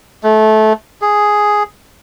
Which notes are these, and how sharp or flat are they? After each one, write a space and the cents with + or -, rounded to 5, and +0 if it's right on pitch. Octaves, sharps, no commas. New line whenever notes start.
A3 -20
G#4 +0